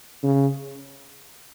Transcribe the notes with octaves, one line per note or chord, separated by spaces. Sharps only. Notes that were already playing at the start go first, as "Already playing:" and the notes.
C#3